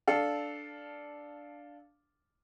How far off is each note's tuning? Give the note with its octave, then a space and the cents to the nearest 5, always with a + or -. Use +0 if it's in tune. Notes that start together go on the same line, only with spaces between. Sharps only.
D4 +0 A4 -10 F5 +0